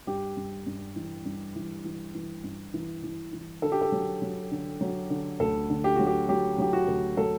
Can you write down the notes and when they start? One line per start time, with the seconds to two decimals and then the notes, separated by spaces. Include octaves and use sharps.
0.07 G2 G4
0.37 G2
0.67 G2
0.96 E3
1.26 G2
1.56 E3
1.85 E3
2.14 E3
2.44 G2
2.74 E3
3.03 E3
3.33 E3
3.62 D3 A4
3.72 G4
3.81 A4
3.92 F#3
4.22 F#3
4.51 D3
4.81 F#3
5.10 D3
5.40 D2 A4
5.70 D3
5.84 G4
5.96 F#3 F#4
6.07 G4
6.29 F#3 G4
6.58 F#3 G4
6.73 F#4
6.88 D2
7.17 F#3 A4